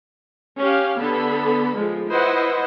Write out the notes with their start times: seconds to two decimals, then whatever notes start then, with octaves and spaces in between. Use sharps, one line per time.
0.59 C#4 G4 F5
0.99 D3 B3 A4 B5
1.75 F3 G#3
2.12 E4 B4 C5 D#5 F#5